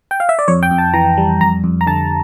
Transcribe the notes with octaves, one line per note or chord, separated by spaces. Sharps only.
G5
F5
E5
D5
F2 C#5
G5
F2
A5
E3 A#5
G3
F2 A#5
F2
A#5
D3 A5